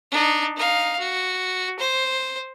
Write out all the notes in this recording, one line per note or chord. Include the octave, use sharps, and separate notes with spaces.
D4 D#4
D#4 F5
F#4
C5